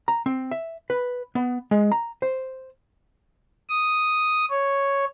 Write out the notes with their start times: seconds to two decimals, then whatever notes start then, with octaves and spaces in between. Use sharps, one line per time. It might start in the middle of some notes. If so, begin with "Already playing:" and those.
0.08 A#5
0.26 C4
0.51 E5
0.90 B4
1.35 B3
1.71 G#3
1.92 A#5
2.22 C5
3.69 D#6
4.50 C#5